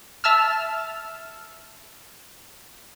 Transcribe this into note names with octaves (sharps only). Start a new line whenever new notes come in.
E5 A5 E6 F6